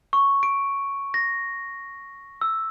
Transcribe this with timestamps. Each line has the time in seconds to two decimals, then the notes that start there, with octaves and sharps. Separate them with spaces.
0.13 C#6
0.43 D7
1.14 A#6
2.41 E6